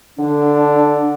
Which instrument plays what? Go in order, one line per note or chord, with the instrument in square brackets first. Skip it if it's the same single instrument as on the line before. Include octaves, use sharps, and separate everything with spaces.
[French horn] D3 [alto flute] D4